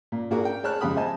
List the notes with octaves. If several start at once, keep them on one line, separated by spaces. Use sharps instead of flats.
A#2
A#2 D4 F#4 G#4 A#4
A#4 G5
G#4 C#5 A5 F6 F#6
F2 C#3 G#3 G4 B5 D#6
C5 D#5 G#5 A5